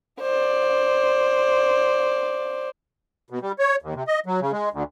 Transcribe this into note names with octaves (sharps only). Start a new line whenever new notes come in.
C5 D5
B2
G3
C#5
D#2
C3
D#5
F#3
C#3
G#3
D2